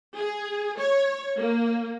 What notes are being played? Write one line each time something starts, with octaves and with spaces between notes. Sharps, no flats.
G#4
C#5
A#3